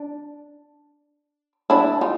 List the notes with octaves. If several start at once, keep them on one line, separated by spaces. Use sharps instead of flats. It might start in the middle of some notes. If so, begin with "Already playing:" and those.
Already playing: D4
D4 E4
D#4 F4